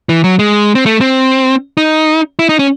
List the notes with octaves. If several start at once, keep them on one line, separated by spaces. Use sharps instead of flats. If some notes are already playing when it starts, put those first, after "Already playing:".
E3
F#3
G#3
C4
A3
C4
D#4
E4
D#4
C#4